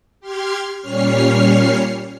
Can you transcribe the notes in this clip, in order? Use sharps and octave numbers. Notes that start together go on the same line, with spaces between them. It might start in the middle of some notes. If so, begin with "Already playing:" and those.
G4 C6 F6 G#6
A#2 G3 C#4 C#5 F6 C7